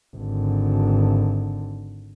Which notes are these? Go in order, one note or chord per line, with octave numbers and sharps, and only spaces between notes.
G#1 D3